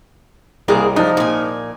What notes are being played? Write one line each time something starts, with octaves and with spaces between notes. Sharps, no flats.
C2 G#3 A#3 G#4
F3 D4 D#4
A#2 G#5